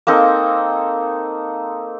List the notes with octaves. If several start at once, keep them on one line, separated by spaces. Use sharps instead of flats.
A#3 C4 D#4 A4